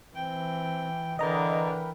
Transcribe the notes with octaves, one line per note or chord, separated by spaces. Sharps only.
E3 C4 G5
D3 E3 A#4 B4 D#5 G5 A#5